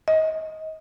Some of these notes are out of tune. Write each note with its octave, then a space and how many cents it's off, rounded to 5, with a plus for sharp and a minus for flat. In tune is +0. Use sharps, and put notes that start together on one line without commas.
D#5 +25